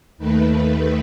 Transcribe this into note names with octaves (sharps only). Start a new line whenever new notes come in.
D#2 D#3 A3 B4